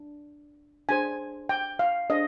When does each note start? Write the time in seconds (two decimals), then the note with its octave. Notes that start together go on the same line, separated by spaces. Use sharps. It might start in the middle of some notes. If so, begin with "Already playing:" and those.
Already playing: D4
0.89 D4 G#4 C5 G#5
1.49 G5
1.79 F5
2.10 D4 G#4 C5 D#5